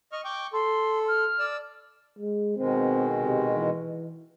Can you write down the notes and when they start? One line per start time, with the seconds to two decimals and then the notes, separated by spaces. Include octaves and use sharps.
0.12 D#5 C#6 F6
0.25 G5 C#6 D6
0.53 A4 C6
1.08 F6
1.39 D5 E6
2.19 G#3
2.57 B2 D#3 G#3 C4
3.24 C3
3.55 E3